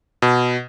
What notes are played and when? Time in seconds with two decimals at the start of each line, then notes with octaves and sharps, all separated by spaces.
0.22 B2